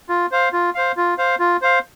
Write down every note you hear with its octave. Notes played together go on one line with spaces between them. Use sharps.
F4
C5 F5
F4
C5 F5
F4
C5 F5
F4
C5 F5